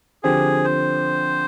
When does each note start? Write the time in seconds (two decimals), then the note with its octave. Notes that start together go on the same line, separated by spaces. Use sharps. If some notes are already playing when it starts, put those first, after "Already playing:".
0.23 D3 F3 C4 G4 G#4
0.64 C5